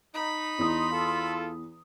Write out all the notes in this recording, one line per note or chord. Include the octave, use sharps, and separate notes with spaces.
D#4 B5
E2 C6 D#6
F4 A4